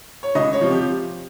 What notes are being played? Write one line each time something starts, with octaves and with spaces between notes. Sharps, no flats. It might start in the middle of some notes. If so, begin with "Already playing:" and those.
C#5
C#2 D#5
C#5
C3 F3
G4